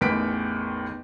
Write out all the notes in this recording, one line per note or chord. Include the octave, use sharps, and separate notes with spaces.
A1 E2 D#3 B4 B6 D7